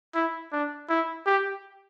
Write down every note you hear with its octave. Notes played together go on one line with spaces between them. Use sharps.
E4
D4
E4
G4